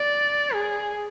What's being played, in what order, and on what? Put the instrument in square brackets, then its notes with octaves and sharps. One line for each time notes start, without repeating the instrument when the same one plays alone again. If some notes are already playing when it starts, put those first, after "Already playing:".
Already playing: [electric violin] D5
G#4